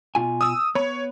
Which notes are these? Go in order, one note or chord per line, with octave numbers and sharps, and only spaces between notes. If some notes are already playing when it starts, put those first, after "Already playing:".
B2 F4 G#5
D#6 E6
B3 C#5 B5